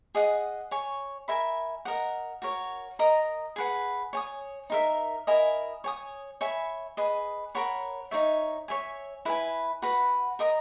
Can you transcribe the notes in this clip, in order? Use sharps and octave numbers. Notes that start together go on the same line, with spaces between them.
G#4 D#5 F#5
C#5 G#5 C#6
A#4 E5 G#5 B5
A#4 D#5 F#5
F#4 A#4 C#5
A#4 D#5 A#5 D#6
G#4 B4 F#5
C#5 G#5 D#6
D#4 A#4 E5
E4 A#4 D#5 G#5
C#5 G#5 D#6
C#5 E5 G#5 B5
G#4 B4 D#5
A#4 C#5 F#5 B5
D#4 F#4 C#5 E5
C#5 E5 G#5
E4 B4 E5 G#5
F#4 B4 F#5 B5
A#4 D#5 A#5 D#6